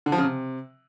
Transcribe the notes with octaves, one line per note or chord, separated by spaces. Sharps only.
D3
F3
C#3
C3